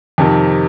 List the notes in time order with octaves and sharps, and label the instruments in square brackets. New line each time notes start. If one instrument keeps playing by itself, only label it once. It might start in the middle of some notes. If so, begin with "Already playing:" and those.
[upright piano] F2 C3 D#3